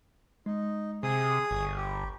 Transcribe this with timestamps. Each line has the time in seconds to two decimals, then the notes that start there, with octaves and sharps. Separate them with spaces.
0.46 G#3 D#4
1.03 C3 G#4 D#6 C7
1.51 G1 C#6
1.77 G4